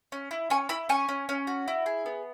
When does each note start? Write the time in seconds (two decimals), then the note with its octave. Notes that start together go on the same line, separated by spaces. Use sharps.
0.12 C#4
0.31 E4
0.50 C#4 G#5 C#6
0.69 E4 B5 E6
0.89 C#4 G#5 C#6
1.09 C#4
1.29 C#4
1.47 F#4
1.68 E4
1.86 G#4
2.06 B3